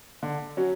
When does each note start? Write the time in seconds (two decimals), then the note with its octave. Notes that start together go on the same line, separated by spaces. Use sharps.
0.23 D3
0.57 F#3 C#4 F#4